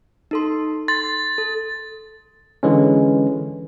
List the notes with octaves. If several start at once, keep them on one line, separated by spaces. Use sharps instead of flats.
D#4 A4 C6
C6 A6
A4
D3 E3 G#3 C#4